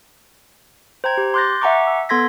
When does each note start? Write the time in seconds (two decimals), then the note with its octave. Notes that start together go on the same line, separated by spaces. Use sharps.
1.04 C5 G5 A#5 G#6
1.17 G4
1.34 C6 D6 F#6 G6 A6 A#6
1.61 E5 F#5 G#5 A#5 C#6 D6
1.87 E6
2.09 B3 A4 C6 G#6 A#6 B6